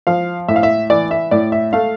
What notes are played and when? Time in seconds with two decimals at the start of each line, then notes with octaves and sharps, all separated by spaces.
0.07 F3 F5
0.48 A2 E5
0.56 F5
0.63 E5
0.90 E3 D5
1.11 E5
1.31 A2 D5
1.52 E5
1.73 A3 F5